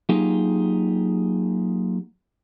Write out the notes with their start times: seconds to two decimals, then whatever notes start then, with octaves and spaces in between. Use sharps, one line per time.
0.09 F#3 A#3 D#4 F4 G4 G#4